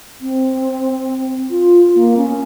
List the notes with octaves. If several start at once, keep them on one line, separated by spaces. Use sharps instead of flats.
C4
F4
A#3
C#4